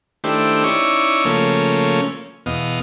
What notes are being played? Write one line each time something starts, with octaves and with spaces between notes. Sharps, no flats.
D#3 A3 D4 E4 G4 C5
C#4 D#4 E4 D5 C#6
C#3 F3 A3 A#3 C#4
E2 B2 D#5 F5